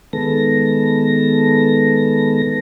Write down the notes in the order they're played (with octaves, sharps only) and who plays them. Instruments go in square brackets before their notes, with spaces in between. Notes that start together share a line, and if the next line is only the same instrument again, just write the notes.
[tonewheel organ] D#3 G#3 B3 A4 A#6